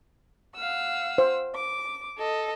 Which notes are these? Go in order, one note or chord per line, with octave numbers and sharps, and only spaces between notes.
F5 F#5 E6
C5
D6
A4 D#5